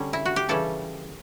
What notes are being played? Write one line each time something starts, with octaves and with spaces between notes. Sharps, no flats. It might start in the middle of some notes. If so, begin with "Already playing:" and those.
Already playing: D3 G3 C#4
E4
F#4
G4
C#3 E3 G3 C#4 A4